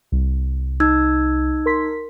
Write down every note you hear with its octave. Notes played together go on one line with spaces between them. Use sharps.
C2
D#4 E6 G#6
A#4 C6 B6